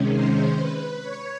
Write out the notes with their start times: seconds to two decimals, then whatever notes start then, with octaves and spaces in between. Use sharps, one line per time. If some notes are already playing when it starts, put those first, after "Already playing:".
Already playing: C3 D#3 G#3 C#4
0.12 C5
0.58 B4
1.02 C#5